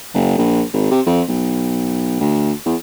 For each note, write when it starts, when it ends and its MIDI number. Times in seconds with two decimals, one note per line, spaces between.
0.14 0.36 30
0.38 0.62 34
0.73 0.88 32
0.91 1.00 48
1.06 1.22 41
1.28 2.15 35
2.20 2.52 38
2.65 2.75 40